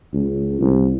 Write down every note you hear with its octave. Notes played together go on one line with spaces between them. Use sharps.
C#2
C2